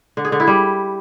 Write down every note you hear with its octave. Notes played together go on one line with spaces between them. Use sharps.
D3
G#4
D3
E4
G3